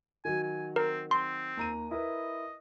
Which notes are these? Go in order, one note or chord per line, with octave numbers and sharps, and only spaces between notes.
D#3 F#3 G#5
G#5
C4 A#4
C4 C6
D#2 A#5 D#7
E4 A#4 B4 D#5